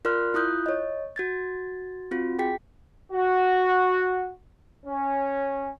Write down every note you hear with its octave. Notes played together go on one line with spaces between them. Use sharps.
F4 A#4 D5 C6 F6 F#6
E4 F4 D#6 F#6 G6
C#5 D#5
F#4 G#6 A6
C4 F4 F#4
G#4 G5 B6
F#4
C#4